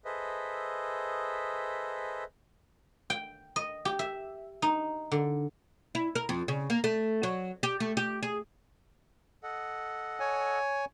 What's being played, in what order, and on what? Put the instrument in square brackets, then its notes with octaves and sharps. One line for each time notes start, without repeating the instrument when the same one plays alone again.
[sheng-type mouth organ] G#4 A4 B4 C5 D#5 E5
[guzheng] G5
D#5
G4
E5
D#4
D3
[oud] E4
A#4
F2
C#3
A#3
A3
F#3
G4
A3
G4
G#4
[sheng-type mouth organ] A4 D#5 F#5
[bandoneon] C#5 G#5